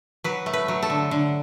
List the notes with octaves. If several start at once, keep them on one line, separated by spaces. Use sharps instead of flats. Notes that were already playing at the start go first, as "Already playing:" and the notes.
F#3 B4
A3
B4
F#3
A4
D3
D3